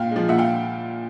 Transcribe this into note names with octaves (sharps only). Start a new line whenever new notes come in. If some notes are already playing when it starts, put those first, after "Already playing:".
Already playing: A#2 F5 G5
F3 G#3
A#2 E5 F#5
F5 G5